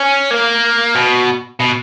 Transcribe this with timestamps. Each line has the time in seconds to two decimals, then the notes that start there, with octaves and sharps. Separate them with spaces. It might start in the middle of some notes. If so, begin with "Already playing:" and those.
Already playing: C#4
0.31 A#3
0.95 B2
1.60 B2